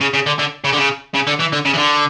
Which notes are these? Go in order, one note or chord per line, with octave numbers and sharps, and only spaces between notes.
C#3
C#3
D3
D3
C#3
D3
C#3
C#3
D3
E3
D3
C#3
E3
D3